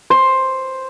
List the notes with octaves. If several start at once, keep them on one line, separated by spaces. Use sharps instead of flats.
C5